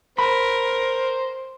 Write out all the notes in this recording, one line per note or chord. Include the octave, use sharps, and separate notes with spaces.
A#4 C5 B5